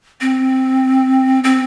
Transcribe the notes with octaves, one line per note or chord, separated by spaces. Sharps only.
C4
C4